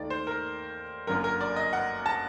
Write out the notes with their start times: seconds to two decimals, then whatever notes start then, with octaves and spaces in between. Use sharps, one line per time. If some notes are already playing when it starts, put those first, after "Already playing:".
Already playing: D#2 D#3 A3 D#4 D5
0.10 C5
0.27 A#4
1.07 G1 F#2 D3 F#3 A#3 A#4
1.24 A#4
1.41 D5
1.56 D#5
1.73 F#5
2.06 A5